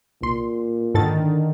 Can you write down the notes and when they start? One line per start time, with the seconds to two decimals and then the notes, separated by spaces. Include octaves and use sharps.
0.22 C2 A#2 C6
0.94 G#2 D3 D#3 A4 A6